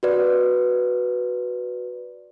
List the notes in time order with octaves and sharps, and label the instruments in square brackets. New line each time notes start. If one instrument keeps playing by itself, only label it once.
[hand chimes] F#4 B4 D5